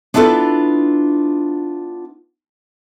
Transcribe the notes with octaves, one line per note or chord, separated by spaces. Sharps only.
B3 D4 E4 F4 A4 B4